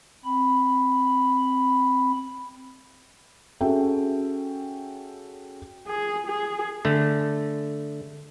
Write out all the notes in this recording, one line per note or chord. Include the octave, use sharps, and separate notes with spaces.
C4 B5
C#4 F#4 G#4 A4 E5 G5
G#4
G#4
D3 A3